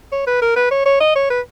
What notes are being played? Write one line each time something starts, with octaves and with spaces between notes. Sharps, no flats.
C#5
B4
A#4
B4
C#5
C#5
D#5
C#5
B4